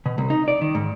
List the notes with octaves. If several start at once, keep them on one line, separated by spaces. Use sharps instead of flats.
B2
C2
D#4
D5
D#3
G#2